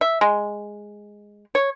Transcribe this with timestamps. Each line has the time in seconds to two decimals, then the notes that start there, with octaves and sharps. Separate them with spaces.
0.01 E5
0.21 G#3
1.55 C#5